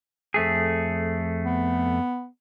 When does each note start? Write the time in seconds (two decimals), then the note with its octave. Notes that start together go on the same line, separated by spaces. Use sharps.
0.34 F2 A3 G#4
1.45 B3